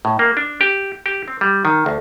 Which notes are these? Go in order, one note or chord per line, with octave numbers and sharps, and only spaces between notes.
A2
A#3
D4
G4
G4
C4
G3
D#3
D2